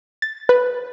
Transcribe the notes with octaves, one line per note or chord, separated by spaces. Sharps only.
A6
B4